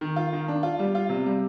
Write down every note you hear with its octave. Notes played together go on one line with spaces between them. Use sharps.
D#3
F4
D#3
D4
F4
G3
F4
C3
G3